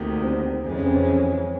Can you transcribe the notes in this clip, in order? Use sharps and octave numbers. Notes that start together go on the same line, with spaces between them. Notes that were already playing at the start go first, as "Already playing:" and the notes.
Already playing: D2 C3 D#3 A#3
C4
F2 C#3 E3 G#3
C#4
C4
C#4